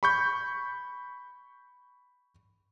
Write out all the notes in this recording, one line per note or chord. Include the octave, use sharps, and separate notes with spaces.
B5 C#6 G6